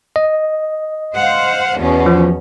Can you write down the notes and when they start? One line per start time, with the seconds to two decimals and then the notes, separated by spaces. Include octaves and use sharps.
0.16 D#5
1.16 C5 F5 F#5
1.77 E2 B2 C#4
2.06 F3